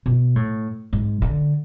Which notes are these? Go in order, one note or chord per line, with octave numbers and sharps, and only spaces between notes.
B2
A2
G#2
D3